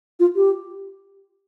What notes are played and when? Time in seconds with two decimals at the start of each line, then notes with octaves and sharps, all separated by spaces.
0.20 F4
0.36 G4